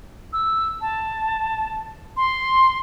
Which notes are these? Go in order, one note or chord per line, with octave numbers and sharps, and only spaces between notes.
E6
A5
C6